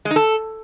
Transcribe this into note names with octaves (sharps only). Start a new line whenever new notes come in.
G#3
D#4
A4